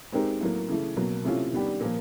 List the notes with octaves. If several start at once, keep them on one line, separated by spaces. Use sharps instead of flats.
G#3 C4 D#4 G4 A#4
A2 F#3 A#3
C#3 E3 A3
B2 F#3 A#3
C3 E3 A3 C#4 F4
D#3 G3 B3 D4 G4
A#2 F3 A#3